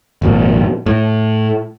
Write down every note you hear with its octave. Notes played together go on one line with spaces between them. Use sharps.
G#1 F2 A#2
A2